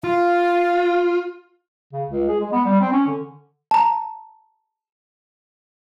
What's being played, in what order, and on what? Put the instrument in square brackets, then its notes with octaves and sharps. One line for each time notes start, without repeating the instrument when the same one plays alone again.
[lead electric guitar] F4 [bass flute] F5
[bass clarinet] C#3
C#2
G#4
G#3
B3
G3
C4
C#4
D3
[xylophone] A5 A#5